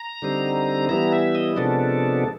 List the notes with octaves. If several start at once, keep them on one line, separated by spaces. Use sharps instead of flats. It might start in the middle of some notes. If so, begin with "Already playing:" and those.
Already playing: A#5
D3 G3 C4 D#4
E3 G3 B3 E4 A#5
E5
D#5
C3 F3 G#3 B3 D4 A4